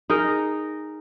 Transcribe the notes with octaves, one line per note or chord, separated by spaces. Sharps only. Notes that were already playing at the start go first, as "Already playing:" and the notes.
D#4 G#4 A#4